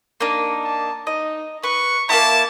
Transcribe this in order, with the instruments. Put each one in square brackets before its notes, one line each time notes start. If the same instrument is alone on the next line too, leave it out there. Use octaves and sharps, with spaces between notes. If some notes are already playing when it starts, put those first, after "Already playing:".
[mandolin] A#3 D4 D#4
[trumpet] A5
[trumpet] D#4 [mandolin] D#5
[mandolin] B4 [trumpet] C#6
[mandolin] A#3 B3 E4 [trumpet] A5